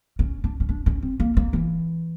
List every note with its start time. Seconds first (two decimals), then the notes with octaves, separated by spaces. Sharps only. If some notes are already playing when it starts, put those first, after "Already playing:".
0.19 C#4
0.44 D4
0.60 C#4
0.69 D4
0.86 C#4
1.02 C4
1.20 A#3
1.37 A#3
1.53 E3